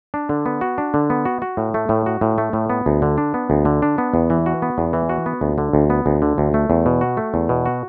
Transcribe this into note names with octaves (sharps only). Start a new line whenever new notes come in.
D4
D3
B3
F#4
D4
D3
B3
F#4
F#4
A2
A3
A2
F#4
A2
A3
A2
B3
D2
D3
D4
B3
D2
D3
D4
B3
E2
E3
F#4
B3
E2
E3
F#4
B3
D2
D3
D2
B3
D2
D3
D2
A3
E2
B2
F#4
A3
E2
B2
F#4